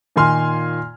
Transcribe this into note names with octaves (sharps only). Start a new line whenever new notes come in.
A#2 D#3 F4 G#5 C6 F6